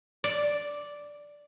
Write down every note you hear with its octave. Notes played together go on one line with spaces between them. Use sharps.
D5